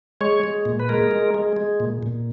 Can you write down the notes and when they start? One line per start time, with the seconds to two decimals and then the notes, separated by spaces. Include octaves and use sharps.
0.21 G#3 C#5
0.44 G#3
0.65 A#2
0.80 B4
0.89 G#3 A#4
1.11 G#3
1.34 G#3
1.57 G#3
1.80 A#2
2.03 A#2